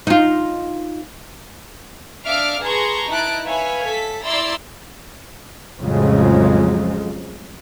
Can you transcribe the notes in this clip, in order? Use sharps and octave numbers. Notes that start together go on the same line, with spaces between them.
D#4 F4
D4 D5 E5 F5 D6 F6
G#4 B4 A5 A#5 C6 C#6
D#4 E4 A5 F#6 D7
B4 C#5 E5 F5 G#5
A4 B6
E4 D5 A#5 C6 E6 A6
A1 F2 C#3 F3 F#3 G#3